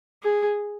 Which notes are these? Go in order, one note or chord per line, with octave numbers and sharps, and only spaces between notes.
G#4